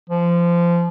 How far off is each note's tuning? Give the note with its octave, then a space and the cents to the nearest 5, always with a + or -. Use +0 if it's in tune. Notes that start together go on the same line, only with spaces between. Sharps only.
F3 -20